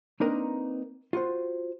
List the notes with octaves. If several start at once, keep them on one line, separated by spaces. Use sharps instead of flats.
A#3 C4 D4 D#4 A#4 B4
F4 F#4 C5